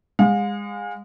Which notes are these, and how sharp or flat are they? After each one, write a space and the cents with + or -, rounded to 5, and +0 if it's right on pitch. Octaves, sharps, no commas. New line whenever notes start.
G#3 -25 F5 +40